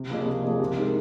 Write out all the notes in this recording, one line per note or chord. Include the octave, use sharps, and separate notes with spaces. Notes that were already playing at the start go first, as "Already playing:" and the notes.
Already playing: C3
F3 A#3 G#4 D#5
C3
F3 A#3 G#4 D#5
C3
G#3 D#4 A#4